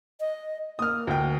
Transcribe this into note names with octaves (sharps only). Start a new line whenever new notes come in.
D#5
A#3 D#6 F6
D2 G5